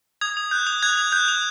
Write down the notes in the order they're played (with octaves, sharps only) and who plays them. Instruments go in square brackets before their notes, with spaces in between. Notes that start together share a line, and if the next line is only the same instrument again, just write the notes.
[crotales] D#6 G#6
D#6
F#6 G6
D#6
F#6 G#6
D#6
F#6 G6
D#6